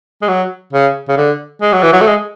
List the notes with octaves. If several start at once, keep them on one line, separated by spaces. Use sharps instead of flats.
G#3
F#3
C#3
C#3
D3
G#3
F#3
E3
F#3
A3
G#3